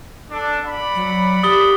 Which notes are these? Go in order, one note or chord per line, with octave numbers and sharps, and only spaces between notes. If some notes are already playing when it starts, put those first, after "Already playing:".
D4 A4
D5 F#5 B5
F#3
G4 D#6 A6 G7